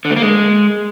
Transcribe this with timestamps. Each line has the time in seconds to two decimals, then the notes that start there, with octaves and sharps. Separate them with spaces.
0.05 D3
0.11 A3
0.16 A#3
0.22 G#3